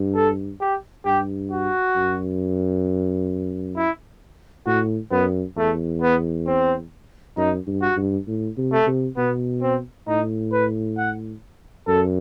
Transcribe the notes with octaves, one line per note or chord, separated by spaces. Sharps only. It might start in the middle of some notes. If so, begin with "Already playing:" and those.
Already playing: G2
A4
G4
G2 G4
F#4
F#2
E4
A2 F#4
F#2 B3
E2 A3
B3
C4
F#2 D#4
G2
F#4
G2
A2
C3
A3
C3
B2 B3
C4
A2 D#4
B4
F#5
F#2 A4